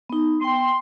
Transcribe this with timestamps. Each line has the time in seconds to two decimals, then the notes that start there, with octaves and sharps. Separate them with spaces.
0.10 B3 D#4
0.41 B3 G5 C6